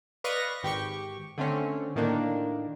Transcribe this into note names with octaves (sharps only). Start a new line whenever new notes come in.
B4 D5 D#5 F5 C#6 A#6
G#1 G4 G5 C#6
D3 A3 C4 C#4
A2 D#3 A#3 D4